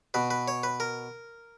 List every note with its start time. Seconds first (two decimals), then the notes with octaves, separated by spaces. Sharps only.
0.14 B2 B4
0.30 B4
0.48 C#5
0.63 B4
0.80 A#4